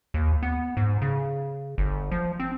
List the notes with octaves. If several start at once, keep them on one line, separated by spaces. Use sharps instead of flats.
D#2
B3
G#2
C#3
G1
F3
C4